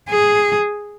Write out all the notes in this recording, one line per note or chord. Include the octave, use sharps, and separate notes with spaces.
G#4